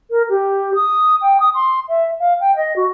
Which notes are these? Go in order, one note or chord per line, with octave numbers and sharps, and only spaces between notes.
A#4
G4
D#6
G5
D#6
C6
E5
F5
G5
D#5
F#4